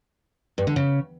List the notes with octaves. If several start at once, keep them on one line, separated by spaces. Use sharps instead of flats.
G2
D3
C#3